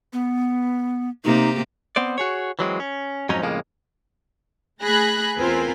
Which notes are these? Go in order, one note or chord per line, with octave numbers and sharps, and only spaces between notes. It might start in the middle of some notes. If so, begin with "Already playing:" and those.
B3
C3 A#3 D#4 G4
B3 C4 C5 D5
F#4 G#4 C#5
E3 F#3 G#3 C4
C#4
F2 G#2 F#3 C#4 D#4
F2 A2 C#3 F3 G#3 A#3
A3 G#4 B5 F#6 A#6
E2 C4 F4 A#4 B4 G#5